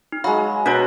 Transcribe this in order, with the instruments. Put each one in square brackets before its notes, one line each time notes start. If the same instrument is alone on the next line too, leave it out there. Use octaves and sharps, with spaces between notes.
[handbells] D#4
[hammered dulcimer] F#3 G#3 [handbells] F5 B5
[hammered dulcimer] B2 B4 A#5 [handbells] D4 F#4 C#5